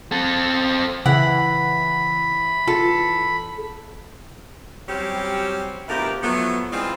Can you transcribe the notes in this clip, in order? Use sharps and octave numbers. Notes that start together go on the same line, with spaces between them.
C4 A4
C#3 E3 F#5 B5
F4 A4
F#3 G3 C4 C#4 G4
D2 B2 F3 E4 G4 A#4
F3 F#3 A3 B3
E3 G#3 C4 D4 F4